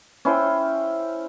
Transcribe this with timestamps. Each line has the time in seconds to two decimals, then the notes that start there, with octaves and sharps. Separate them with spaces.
0.25 C#4 E4 C5 G5